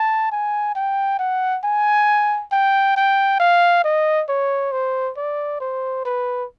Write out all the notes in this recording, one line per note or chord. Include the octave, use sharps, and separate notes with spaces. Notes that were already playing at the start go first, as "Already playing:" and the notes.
Already playing: A5
G#5
G5
F#5
G#5
G5
G5
F5
D#5
C#5
C5
D5
C5
B4